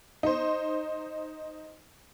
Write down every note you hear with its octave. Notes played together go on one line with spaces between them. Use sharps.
D#4 C5